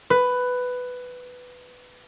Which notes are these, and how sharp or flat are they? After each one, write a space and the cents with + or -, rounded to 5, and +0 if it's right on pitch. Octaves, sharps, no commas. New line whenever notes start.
B4 +10